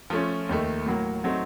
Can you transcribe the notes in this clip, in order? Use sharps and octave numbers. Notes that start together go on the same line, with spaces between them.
F3 A3 C#4
D#2 D#3 A3
A2 F#3 A#3
F#3 A3 C4 D#4